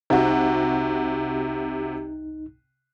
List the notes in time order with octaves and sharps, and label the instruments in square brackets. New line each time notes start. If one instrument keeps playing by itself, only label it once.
[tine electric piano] G1 C2 D#4 [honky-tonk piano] C3 F#4